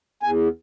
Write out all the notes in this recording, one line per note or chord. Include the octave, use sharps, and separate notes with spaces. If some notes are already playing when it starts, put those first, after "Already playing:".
E2 G#5